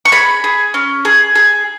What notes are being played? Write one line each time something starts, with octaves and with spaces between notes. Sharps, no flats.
C#6
G#4 B5
G#4
C#4
G#4
G#4